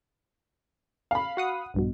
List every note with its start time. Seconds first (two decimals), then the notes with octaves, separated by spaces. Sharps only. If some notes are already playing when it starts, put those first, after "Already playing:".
1.11 F5 B5
1.37 F#4 F#5 D#6
1.74 A#1 G2 B2